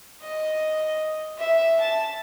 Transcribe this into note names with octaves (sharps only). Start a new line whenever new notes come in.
D#5
E5
A5